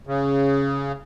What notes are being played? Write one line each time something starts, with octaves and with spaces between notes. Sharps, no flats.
C#3